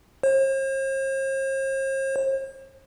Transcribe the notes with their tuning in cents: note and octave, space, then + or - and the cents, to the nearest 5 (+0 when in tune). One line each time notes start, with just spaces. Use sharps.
C5 +45